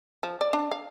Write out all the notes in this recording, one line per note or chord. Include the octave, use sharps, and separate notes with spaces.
F3
D5
D4
F5